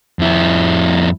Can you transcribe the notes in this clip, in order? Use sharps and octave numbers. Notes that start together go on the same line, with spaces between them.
F2 E4